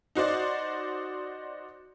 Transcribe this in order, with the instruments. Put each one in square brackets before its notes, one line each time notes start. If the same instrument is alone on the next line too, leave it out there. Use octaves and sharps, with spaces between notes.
[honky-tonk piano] D#4 F#4 C5 D5